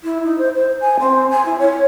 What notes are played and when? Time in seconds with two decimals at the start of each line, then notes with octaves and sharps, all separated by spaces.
0.03 E4
0.25 D#4
0.38 C5
0.56 C5
0.81 G#5
0.99 C4
1.30 G#5
1.45 E4
1.59 C#5